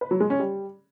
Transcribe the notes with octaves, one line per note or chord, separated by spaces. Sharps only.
B4
F#3
G#3
C#4
G3